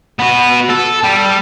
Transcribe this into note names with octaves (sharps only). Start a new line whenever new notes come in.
B3 F#4
A4
G3